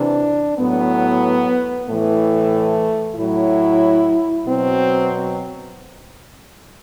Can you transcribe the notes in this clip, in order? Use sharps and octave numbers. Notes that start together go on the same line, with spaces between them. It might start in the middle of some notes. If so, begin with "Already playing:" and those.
Already playing: C3 E3 D4
A2 F#3 B3
A2 E3 A3
A2 F#3 E4
B2 F#3 C4